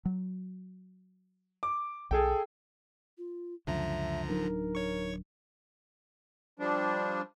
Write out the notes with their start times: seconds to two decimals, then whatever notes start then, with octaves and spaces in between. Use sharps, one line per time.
0.05 F#3
1.63 D6
2.11 B1 G#4 A4 G5
3.18 F4
3.67 C#2 F#2 D3 F3 E5 A#5
4.30 D1 F#3 D4 D#4 A#4
4.75 C#5 C#6
6.59 F3 G3 D4